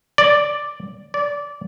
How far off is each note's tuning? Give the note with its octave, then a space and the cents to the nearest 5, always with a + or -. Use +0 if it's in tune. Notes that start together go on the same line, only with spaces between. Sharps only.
D5 +0
D5 -20